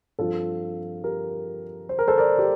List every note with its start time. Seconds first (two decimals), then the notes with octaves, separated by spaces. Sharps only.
0.19 G2 F3 C4 F4 A4
1.04 G4 A#4
1.89 C5
1.99 A#4
2.08 A4 C5
2.18 A#4 D5
2.39 G4